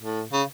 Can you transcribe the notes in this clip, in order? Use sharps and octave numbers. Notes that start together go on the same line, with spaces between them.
A2
C#3